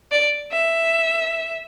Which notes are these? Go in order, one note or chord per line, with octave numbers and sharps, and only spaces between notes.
D5
E5